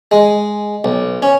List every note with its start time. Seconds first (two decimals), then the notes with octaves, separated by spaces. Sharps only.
0.11 G#3
0.84 B1
1.22 C#4